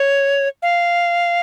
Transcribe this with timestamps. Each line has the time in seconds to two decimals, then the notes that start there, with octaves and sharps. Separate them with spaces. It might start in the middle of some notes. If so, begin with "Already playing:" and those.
Already playing: C#5
0.63 F5